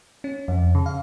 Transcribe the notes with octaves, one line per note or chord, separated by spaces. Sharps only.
C#4
F2
C#3
F5